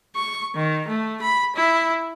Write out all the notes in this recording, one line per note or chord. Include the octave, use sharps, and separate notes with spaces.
C#6
D#3
A3
B5
E4